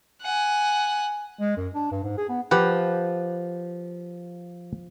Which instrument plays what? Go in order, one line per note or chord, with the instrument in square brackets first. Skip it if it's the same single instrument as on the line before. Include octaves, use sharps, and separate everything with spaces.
[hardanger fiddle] F#5 G#5
[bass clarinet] G#3
F#2
D4
G2
G#2
G#4
B3
[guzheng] F3 [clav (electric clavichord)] G4 B4 F#5